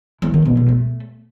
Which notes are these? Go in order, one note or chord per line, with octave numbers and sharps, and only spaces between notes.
E3
D#3
B2
B2
A3